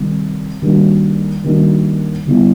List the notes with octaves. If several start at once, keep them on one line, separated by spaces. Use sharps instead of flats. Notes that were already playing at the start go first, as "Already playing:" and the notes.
Already playing: C3 D#3 G3
D#3 G3 A#3 D4 F#4
D#3 G3 A#3 D4 F#4
D3 G3 B3 E4